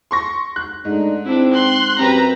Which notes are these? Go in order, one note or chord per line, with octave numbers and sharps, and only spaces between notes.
C6 C#6 A#6
F#6
G#2 A3 D4 D#4
C4 D4 E4
C6 F#6
F#2 C4 G4 B4 A#5